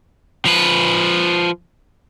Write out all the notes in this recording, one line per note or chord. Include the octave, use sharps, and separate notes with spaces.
F3 B4